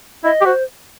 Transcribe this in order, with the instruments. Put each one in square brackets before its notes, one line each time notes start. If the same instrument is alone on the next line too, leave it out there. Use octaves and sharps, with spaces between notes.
[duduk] E4 [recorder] D#5
[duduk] G4
[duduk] F#4 [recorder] C5